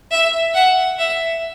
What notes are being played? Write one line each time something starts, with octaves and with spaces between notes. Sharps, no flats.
E5
F#5
E5